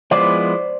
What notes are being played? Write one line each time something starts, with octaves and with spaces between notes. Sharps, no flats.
F3 G#3 B3 E4 C5 D5